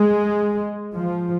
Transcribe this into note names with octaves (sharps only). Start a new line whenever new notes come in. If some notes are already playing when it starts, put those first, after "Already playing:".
Already playing: G#3
F3